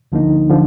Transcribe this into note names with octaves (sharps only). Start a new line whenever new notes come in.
D2 D3 F3 A#3 D#4
D3 F3